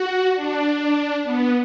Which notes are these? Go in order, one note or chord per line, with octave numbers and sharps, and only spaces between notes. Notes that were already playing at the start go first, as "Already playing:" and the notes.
Already playing: F#4
D4
B3